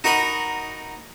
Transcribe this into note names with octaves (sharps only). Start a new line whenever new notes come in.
D#4 F#4 A#4 D#5 B5